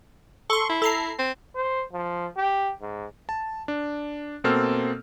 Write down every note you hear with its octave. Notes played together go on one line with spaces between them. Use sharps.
A4 C6 C#6
E4
A4 A#5 C7
C4
C5
F3
G4
G#2
A5
D4
B2 A#3 C4 A4 F6